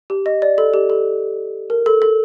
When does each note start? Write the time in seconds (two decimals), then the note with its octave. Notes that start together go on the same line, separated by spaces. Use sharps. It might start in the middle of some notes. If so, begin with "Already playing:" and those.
0.10 G4
0.26 D#5
0.42 D5
0.58 A4
0.74 G4
0.90 A4
1.70 A#4
1.86 A4
2.02 A4